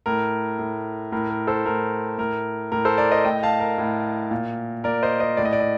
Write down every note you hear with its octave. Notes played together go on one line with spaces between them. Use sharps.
A2 A#4
A2
A2 A#4
A#4
A4 C5
A2 A#4
A2 A#4
A2 A#4
A4 C5
A#4 D5
C5 D#5
A2 D#5 G5
F5 A5
A#4
A2
A#2
A#2 A#4 D5
C5 D#5
C5 D#5
A2 D5
D#5
D5
D#5